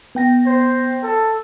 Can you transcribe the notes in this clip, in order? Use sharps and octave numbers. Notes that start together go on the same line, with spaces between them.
B3 G5 A#6
C5
A4